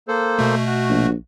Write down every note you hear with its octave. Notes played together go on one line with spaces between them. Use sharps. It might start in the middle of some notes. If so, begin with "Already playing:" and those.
A#3 A4 C5
B2 A3
F#4
A#1